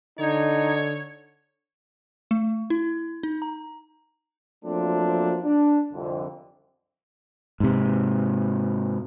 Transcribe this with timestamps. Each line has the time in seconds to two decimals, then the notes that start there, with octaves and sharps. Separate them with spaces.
0.19 D3 D#4 C#5
2.31 A3
2.70 E4
3.23 D#4
3.42 A#5
4.65 F3 F#3 A3 A#3 C4 D4
5.44 D4
5.93 C2 F2 D3
7.60 G#2 C3